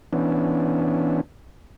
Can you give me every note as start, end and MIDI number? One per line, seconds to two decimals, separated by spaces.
0.13 1.21 52
0.13 1.21 59
0.13 1.21 61
0.13 1.21 62